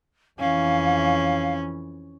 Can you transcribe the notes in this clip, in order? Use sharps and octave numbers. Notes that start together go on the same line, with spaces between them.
F2 E3 C#4 F5